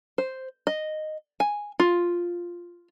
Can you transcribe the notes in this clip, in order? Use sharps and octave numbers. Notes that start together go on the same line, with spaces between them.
C5
D#5
G#5
F4